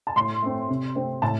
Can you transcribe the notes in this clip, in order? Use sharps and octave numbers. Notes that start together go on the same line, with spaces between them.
A5
A2 C6
A3 C4
C3
A3 C4
A2 A5